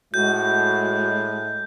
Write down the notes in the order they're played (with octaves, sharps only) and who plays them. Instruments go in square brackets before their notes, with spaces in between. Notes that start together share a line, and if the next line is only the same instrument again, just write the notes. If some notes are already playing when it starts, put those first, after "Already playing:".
[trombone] A2 [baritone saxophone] G#3 [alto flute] F#4 [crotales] G6